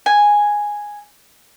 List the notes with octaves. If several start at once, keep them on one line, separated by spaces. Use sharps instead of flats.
G#5